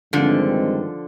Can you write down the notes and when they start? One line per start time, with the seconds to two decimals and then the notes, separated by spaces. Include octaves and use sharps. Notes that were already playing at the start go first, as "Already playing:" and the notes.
0.13 G2 D3 D#3 F3 G#3 C4